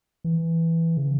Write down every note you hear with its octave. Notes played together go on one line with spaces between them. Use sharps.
E3
C#3